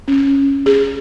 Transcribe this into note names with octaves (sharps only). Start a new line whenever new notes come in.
C#4
G#4